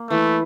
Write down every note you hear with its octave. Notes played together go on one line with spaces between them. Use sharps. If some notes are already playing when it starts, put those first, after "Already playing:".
Already playing: A#3
E3 A3